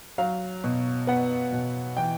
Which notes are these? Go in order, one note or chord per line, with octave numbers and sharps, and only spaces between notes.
F#3 F5
B2
B3 F#5
B2
E3 G5